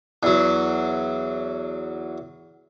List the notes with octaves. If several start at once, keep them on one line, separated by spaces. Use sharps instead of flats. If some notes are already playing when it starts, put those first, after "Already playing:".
E2 F#3